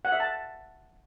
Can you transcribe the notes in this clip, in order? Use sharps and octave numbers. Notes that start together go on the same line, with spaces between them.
F#5
E5
A5